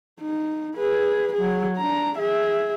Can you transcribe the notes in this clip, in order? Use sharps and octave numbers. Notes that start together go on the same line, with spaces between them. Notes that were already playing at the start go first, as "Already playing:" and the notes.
D#4
G#4 B4
F#3 G#4
D4 A#5
G#4 E5